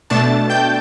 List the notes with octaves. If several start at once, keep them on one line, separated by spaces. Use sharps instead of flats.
B2 A3 D4 A5 A6
G5 G6